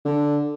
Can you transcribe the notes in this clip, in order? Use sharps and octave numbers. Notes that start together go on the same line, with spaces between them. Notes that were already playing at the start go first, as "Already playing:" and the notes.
D3